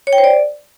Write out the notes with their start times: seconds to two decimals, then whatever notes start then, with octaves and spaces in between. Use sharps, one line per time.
0.07 C#5
0.13 G5
0.18 C5
0.24 D5